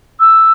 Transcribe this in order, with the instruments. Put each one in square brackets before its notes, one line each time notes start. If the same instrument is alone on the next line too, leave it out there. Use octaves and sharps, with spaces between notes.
[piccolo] E6